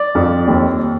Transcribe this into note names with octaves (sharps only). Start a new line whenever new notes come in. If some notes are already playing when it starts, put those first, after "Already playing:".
Already playing: D5
F2
D#2